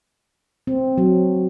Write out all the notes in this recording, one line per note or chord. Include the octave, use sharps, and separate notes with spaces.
C4
F#3